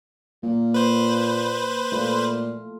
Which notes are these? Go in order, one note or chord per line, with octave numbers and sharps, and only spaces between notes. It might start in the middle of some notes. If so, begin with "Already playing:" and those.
A#2 A#3
B4 C5
A#2 A3 F4